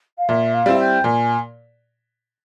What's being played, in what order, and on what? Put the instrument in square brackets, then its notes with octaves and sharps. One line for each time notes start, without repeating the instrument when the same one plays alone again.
[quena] F5
[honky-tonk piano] A#2 [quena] E5
[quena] F5
[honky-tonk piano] G3 C4 E4
[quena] G5
[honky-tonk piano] A#2 [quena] G#5